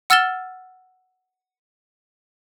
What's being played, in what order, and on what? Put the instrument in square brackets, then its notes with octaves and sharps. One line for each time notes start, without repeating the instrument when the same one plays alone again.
[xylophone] F#5 E6 F6 A6 E7 G7